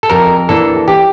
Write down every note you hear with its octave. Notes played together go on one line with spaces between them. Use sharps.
A4
F2 A#4
E3 A#3 D4 A4
G4